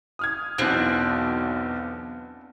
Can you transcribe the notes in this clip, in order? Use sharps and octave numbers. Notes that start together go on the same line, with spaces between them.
D#6 F6 G#6
B1 E2 B2 B3 C4 D4